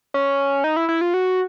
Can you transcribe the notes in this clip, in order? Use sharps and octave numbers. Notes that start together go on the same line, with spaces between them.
C#4
D#4
E4
E4
F4
F#4